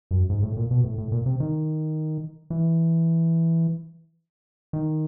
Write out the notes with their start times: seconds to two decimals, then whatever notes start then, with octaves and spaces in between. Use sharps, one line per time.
0.11 F#2
0.30 G#2
0.43 A2
0.57 A#2
0.71 B2
0.84 A2
0.98 A2
1.12 A#2
1.26 C3
1.40 D#3
2.50 E3
4.73 D#3